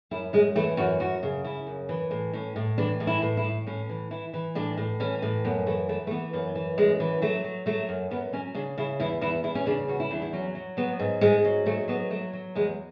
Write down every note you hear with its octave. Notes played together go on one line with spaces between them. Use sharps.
F#2 E4
F#2 G#3
E3 A3
F#2 F#4
F#2 F#4
C#3
C#3 E4
F#2
E3
A2
A2 C#4
A2
E3 D4
A2
E4
A2
E4
A2
A2 C#4
E3
E3 E4
E3
A2 D4
A2
E3 C#4
A2
F#2 B3
E3 A3
E3 A3
A3
E3 B3
F#2 B3
E3
F#2 G#3
E3
F#3 A3
F#3
F#3 A3
F#2
F#2 B3
F#3 C#4
C#3 D4
C#3 E4
E2 E4
E2 E4
E2 E4
C#4
C#3 D4
E2 F#4
E4
E2 D4
E4
F#3 C#4
F#3
F#3 B3
G#2
G#2 G#3
F#3
G#2 A3
F#3 B3
F#3 A3
F#3
E2 G#3